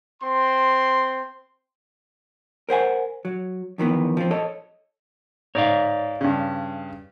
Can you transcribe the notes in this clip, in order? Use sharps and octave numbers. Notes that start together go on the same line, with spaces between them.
C4 C6
A#4 C5 F#5 G#5
F#3
F2 D#3 E3 B3
F3 C4
A4 C#5 D#5
G#2 C#5 D5 F5
G2 C#3